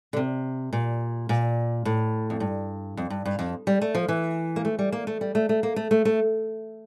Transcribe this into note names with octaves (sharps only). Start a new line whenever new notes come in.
D3
C3
A#2
A#2
A2
F2
G2
F2
G2
G2
F2
G3
A3
F3
E3
A#3
A3
G3
A#3
A3
G3
A3
A3
A#3
A3
A3
A3